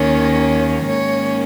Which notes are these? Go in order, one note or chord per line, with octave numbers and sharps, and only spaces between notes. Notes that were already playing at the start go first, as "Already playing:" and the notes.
Already playing: D#2 D#3 A#3 C#4 C#5
G#2 D#3 A#3 C#4 C#5